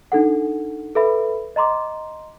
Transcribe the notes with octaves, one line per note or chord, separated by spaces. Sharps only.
D4 D#4 A4 F#5
A4 B4 E5 B5
D#5 A#5 C6 D6